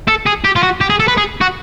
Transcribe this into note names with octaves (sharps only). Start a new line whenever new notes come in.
A4
G#4
G4
F4
F#4
G4
G#4
A4
B4
G#4
F#4